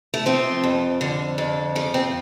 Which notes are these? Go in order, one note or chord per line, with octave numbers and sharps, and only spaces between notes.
A3
F3 C4
F2
D3
F2
F3 A3
C4